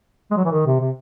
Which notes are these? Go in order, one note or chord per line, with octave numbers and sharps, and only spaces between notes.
G#3
F#3
E3
D#3
C3
C3